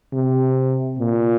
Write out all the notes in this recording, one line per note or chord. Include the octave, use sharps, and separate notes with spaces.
C3
A#2